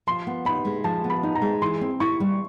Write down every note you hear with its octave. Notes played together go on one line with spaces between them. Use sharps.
F3 C6
B3
D#4 B5
G#3
F3 A5
B3
B5
D#4
A#5
G#3
E3 C6
C4
E4 C#6
G3